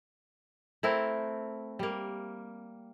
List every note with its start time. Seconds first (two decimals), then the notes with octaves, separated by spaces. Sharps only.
0.83 A3 C4 E4 A#4
1.79 G3 A#3